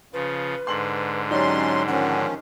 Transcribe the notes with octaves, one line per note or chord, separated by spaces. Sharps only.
C#3 F3 B4
G#2 D3 C6 F#7
F#3 C#4 D#4 G4 D5 C6
D#3 F3 C#4 F#5